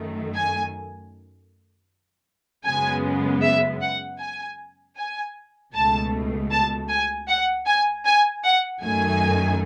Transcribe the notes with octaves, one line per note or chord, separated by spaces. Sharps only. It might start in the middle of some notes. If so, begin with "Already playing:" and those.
Already playing: F#2 D#3 A3
G#5
F#2 C#3 G#3 B3 G#5
E5
F#5
G#5
G#5
C#2 B2 A3 A5
A5
G#5
F#5
G#5
G#5
F#5
F#2 D#3 A3 G#5